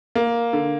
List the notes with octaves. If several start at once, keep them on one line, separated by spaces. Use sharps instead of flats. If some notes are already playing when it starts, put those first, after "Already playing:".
A#3
D3